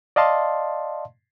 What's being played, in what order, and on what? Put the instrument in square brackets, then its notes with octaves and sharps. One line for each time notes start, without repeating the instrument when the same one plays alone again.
[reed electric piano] D5 D#5 F5 A5 C6